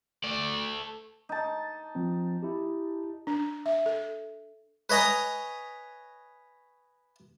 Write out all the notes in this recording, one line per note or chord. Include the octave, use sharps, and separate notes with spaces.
A3 D5
D#4 A5
F3 C4
E4 G4
D4
E5
A4
B4 C#5 D#5 G#5 A#5